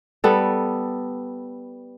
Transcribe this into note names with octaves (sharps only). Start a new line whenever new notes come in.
G3 B3 A4